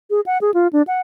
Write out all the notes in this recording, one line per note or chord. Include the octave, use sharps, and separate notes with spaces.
G#4
F#5
G#4
F4
D4
F#5